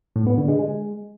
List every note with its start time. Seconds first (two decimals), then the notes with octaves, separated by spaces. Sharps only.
0.16 A2
0.27 B3
0.37 D3
0.48 G#3
0.59 G#3